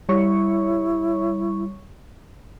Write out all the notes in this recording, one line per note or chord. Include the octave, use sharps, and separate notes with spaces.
G3 E4 C#5 C#6